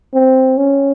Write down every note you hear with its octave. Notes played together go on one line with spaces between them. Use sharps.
C4
C#4